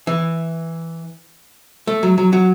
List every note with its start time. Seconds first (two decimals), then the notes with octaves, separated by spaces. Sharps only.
0.07 E3
1.87 A3
2.03 F#3
2.18 F#3
2.33 F#3